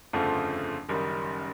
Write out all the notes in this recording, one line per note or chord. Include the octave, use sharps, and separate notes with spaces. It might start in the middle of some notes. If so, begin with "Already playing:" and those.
G1 F2 C#3 F3 A3
F#1 F#2 D#3 G3